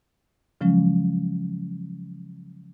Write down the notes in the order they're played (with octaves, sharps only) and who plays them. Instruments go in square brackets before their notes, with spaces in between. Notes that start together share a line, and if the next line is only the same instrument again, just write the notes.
[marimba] C#3 F3 F#3 G#3 C#4